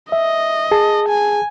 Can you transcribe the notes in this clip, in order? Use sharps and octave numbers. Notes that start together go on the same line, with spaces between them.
D#5 E5
G#4 A5
G#5